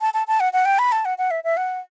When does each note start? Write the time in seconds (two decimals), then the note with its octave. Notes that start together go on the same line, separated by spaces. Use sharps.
0.01 A5
0.14 A5
0.27 A5
0.40 F#5
0.53 F#5
0.65 G5
0.79 B5
0.92 A5
1.05 F#5
1.18 F#5
1.31 E5
1.44 E5
1.57 F#5